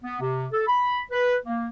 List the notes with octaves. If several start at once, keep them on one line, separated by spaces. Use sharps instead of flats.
B3
C3
A4
B5
B4
A#3